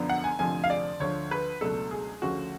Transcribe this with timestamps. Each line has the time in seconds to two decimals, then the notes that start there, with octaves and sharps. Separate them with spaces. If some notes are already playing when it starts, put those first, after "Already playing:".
Already playing: F#2 D3 F3 B3 D4
0.09 F#5
0.24 G#5
0.39 F1 F2 D3 F3 A3 G#5
0.64 F5
0.70 D5
1.00 D2 D3 F3 C#5
1.31 B4
1.61 C#2 B2 F#3 A3 D4 A4
1.91 G#4
2.22 D2 C#3 F3 A3 C#4 F#4